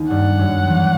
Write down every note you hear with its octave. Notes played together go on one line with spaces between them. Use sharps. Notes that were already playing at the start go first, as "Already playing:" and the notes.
Already playing: D#2 D#3
G2 G3 F#5
F#2 F#3
E2 E3